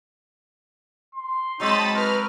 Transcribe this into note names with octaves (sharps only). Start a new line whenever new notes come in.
C6
F#3 G#3 C4 D#4 A5 B5 A6
A#4 B4 F6